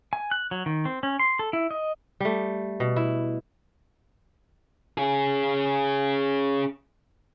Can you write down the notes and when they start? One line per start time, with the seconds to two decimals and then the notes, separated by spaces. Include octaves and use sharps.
0.13 G#5
0.31 F#6
0.51 F#3
0.66 D#3
0.85 C4
1.03 C#4
1.19 C6
1.39 A4
1.53 E4
1.71 D#5
2.20 G3 A3
2.80 B2
2.96 E4
4.98 C#4 G#4